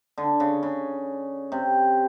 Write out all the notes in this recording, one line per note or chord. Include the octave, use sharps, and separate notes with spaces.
D3
C#3
C#3
C3